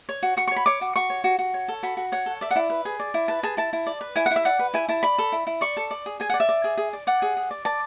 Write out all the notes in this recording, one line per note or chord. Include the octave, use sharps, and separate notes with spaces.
C#5
F#4
F#4 C#6
C#6
C#5
B5
C#5 D6
F#4
F#4 C#6
C#5
F#4
F#4
C#5
A4
F#4 B5
F#4
C#5 F#5
A4
D5 E5
F#5
E4
B4
G#4
D5
E4
B4 A5
G#4 A5
E4 A5
E4
D5
B4
E4 G#5
F#5
E4
E5
D5 F#5
B4
E4 G#5
E4 A5
D5 B5
A4
E4
E4
D5 C#6
A4
D5
G#4
G#4 G#5
F#5
D5
E5
D5
G#4
G#4
D5
D5 F#5
G#4
G#4
D5
D5 A5